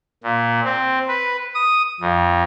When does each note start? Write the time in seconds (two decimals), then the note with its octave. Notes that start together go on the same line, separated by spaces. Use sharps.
0.23 A#2
0.64 C4
1.08 B4
1.54 D#6
2.00 F2